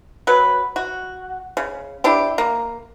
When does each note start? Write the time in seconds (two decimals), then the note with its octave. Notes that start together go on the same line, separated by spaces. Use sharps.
0.27 F#3 B4
0.76 F#4
1.57 C#3
2.04 D4 E4 G4
2.38 A#3